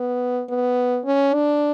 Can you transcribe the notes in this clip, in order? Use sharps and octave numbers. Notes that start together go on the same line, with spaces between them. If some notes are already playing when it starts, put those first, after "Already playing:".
Already playing: B3
B3
C#4
D4